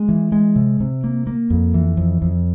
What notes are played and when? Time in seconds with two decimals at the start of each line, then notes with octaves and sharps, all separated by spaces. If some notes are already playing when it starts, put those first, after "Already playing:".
Already playing: G#3
0.09 E3
0.32 G#3
0.56 C3
0.80 C3
1.04 A#3
1.27 A#3
1.50 F2
1.74 E3
1.97 F2
2.22 F2